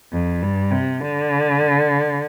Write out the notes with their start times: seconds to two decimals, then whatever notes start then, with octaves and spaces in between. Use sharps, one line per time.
0.12 F2
0.42 G2
0.71 C3
1.01 D3